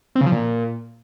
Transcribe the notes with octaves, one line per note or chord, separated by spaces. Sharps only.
C4
C#3
F3
A#2